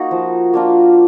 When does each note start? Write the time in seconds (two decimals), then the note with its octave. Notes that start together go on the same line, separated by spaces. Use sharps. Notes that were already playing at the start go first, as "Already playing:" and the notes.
Already playing: A#3 D#4 F#4
0.11 F3
0.54 A#3 D4 F4